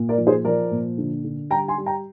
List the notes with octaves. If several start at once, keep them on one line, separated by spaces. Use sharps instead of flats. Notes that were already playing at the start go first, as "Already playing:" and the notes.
Already playing: A#2
A#4 D5
F3
G#4 C5
F3 A#4 D5
A#2
D3
D3
G3 G5 A#5
G#5 C6
G3
G5 A#5